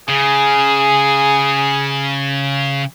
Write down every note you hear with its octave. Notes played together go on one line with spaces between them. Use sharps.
C#3 G#4